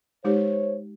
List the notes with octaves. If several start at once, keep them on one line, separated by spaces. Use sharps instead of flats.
G#3 D#4 G4 C5 C#5